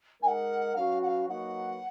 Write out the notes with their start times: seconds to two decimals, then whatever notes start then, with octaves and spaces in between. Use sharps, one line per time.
0.22 G#3 D#4 A#4 F#5 G#5
0.75 F#3 C#4 F#4 B4 F5
1.02 F#5
1.06 F5
1.28 F#3 A#3 D#4 F#4 B4 F#5